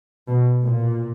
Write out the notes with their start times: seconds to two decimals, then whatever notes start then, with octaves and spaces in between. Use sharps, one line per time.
0.28 B2
0.63 A#2